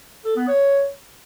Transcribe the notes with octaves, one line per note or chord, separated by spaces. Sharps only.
A4
B3
C#5